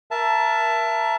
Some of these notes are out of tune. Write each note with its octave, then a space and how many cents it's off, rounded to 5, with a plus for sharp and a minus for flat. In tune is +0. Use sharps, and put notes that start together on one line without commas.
A#4 +20 E5 +25 A5 +0